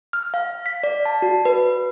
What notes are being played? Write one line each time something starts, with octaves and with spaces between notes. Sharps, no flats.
F6
F5
B6
D5
A5
F#4
B4